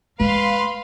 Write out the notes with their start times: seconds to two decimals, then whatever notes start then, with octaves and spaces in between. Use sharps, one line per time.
0.20 G#3 B4 F5 C6